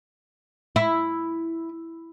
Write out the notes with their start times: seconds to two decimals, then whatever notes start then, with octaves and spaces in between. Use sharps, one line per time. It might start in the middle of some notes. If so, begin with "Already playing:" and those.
0.76 E4